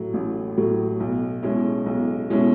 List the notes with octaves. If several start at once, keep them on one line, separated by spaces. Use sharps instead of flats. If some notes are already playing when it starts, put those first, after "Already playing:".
Already playing: A2 F#3
A1
A2 F#3
B1
B2 G#3 C#4 E4
B1
B2 G#3 C#4 E4